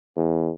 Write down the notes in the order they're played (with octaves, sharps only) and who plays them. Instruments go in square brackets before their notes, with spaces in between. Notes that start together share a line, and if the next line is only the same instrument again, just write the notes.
[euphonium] E2